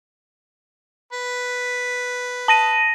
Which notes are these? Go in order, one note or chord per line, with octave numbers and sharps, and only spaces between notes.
B4
A5 A#6 D#7